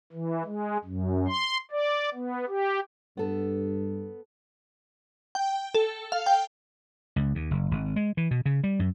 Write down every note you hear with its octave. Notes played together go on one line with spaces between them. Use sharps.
E3
G#3
F#2
C6
D5
B3
G4
G2 B3 A4
G5
A4
F5
G5
C#2
D#2
F#1
G#1
G#3
E3
B2
C#3
G3
F#2